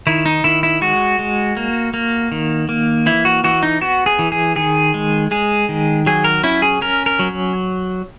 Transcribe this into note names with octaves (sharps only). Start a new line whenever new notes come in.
D#3 E4
D#4
D#3 E4
E4
G#3 F#4
G#3
A#3
A#3
D#3
A#3
E3 E4
F#4
E3 F#4
D#4
B3 F#4
G#4
E3
G#4
D#3 G#4
G#3
G#3 G#4
D#3
F#3 G#4
A#4
C#4 E4
G#4
C#4 A#4
A#4
F#3